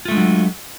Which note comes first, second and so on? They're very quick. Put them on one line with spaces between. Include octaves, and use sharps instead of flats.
F4 A3 G#3 D4 F#3